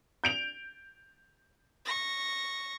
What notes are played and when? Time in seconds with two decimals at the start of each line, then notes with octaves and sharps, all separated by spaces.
0.24 G6 D7 F7
1.85 C#6 A#6